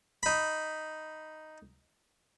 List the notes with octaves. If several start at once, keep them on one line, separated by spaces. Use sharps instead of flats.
D#4 B5